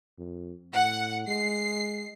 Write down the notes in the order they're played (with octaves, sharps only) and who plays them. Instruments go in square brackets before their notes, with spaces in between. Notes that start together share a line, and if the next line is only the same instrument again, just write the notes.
[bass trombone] F2
[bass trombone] A2 [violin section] F#5
[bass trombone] G#3 [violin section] C7